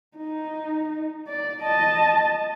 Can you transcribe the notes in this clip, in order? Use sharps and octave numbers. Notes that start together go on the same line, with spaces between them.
D#4
D5
D#5 A5